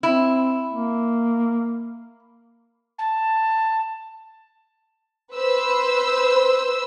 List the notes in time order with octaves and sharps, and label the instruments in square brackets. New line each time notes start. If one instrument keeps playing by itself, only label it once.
[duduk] C4 [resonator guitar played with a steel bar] E4
[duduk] A#3
[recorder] A5
[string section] B4 C5 E6